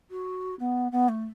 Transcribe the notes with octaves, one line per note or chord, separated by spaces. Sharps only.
F#4
B3
B3
A3